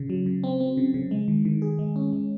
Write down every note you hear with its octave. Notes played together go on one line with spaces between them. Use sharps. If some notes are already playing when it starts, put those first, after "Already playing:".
Already playing: C#3
F#3
C#3
C4
C4
C#3
C#3
G#3
D#3
D#3
G#4
G#3
C#4
G#3